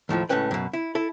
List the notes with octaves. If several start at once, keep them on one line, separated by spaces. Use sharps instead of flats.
D#2 A2 E3 F3
C#2 A2 F#3 C#4 B4 G5
F#2 B2
E4
E4 A4